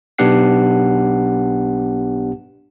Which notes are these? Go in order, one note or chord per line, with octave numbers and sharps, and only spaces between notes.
B1 B3 D4 G4 F#5 C7